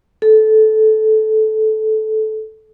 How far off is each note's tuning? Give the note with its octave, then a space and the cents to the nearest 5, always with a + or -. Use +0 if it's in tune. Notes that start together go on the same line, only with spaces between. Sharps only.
A4 -15